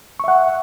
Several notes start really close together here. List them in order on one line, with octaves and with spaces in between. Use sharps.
C#6 E5 F#5